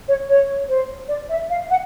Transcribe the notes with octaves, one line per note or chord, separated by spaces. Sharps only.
C#5
C#5
C5
D5
E5
F5
F#5